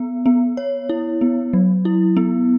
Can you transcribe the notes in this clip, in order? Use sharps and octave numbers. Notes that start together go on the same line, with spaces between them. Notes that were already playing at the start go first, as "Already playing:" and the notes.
Already playing: B3
B3
C#5
E4
B3
F#3
E4
B3